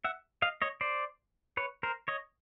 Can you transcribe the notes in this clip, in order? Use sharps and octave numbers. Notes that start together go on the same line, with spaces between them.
E5 F#5
D#5 F5
C#5 D#5
C5 D5
B4 C#5
A#4 C5
C#5 D#5